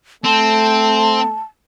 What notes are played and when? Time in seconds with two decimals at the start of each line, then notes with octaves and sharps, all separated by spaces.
0.24 A3 C4 A5